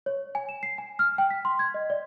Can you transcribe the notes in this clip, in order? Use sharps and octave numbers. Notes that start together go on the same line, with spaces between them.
C#5
G#5
E7
C7
G#5
F6
G5
B6
C6
G#6
D#5
D5